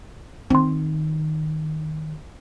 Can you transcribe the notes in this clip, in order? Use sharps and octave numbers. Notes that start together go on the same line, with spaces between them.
D#3 C4 C6